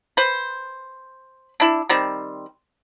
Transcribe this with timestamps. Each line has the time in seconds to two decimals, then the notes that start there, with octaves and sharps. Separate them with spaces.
0.17 B4 C5
1.60 D4 E4
1.89 D#3 G3 C4